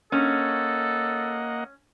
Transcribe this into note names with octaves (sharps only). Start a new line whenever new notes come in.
A#3 C#4 A4 D#5 F#5